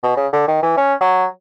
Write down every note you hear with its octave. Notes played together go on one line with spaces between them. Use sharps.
B2
C#3
D3
D#3
E3
C#4
F#3